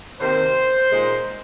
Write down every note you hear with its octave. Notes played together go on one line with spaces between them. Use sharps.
C3 D#3 A#3 C5
A#2 G#3 D#4